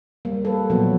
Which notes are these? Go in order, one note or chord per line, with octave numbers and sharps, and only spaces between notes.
G3 A#3
A4 B4
A#2 F3 F#3 B3 F#4